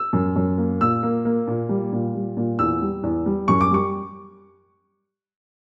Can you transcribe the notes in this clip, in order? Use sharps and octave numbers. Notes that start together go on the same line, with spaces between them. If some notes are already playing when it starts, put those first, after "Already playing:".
Already playing: E6
F#2
F#2
A#3
A#2 E6
A#3
A#3
A#2
G3
A#2
G3
A#2
E2 E6
G3
E2
G3
F#2 C#6
D6
G3 C#6